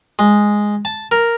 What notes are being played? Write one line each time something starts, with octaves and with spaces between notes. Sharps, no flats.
G#3
A5
A#4